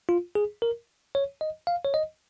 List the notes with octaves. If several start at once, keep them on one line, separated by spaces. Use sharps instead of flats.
F4
G#4
A#4
C#5
D#5
F5
C#5
D#5